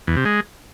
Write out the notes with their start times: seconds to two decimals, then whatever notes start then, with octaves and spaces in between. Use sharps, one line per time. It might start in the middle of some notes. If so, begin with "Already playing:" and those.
0.08 E2
0.16 C3
0.25 G#3